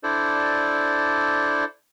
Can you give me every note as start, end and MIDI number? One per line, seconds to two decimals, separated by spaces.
0.03 1.65 62
0.03 1.65 64
0.03 1.65 69
0.03 1.65 72
0.03 1.65 74